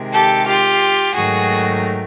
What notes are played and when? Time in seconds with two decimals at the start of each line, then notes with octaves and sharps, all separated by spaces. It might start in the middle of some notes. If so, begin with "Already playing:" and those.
Already playing: C3 D#3 G#3
0.13 G4 A4
0.47 F4 G4
1.14 G#2 D#3 F#3 A3 F#4 G#4